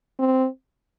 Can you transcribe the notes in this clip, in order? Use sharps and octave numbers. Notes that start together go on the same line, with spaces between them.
C4